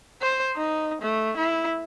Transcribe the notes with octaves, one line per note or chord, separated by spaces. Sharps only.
C5
D#4
A3
E4